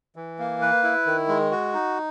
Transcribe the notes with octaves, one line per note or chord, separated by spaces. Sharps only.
E3
A#3
B4
E4
D#3
G#3
F#4
D#4